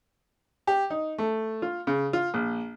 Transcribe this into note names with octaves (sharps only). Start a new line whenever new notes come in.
G4
D#4
A3
F4
C#3
F4
A#1